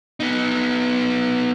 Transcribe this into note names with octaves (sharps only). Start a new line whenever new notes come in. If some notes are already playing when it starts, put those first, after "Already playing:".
B3 D#4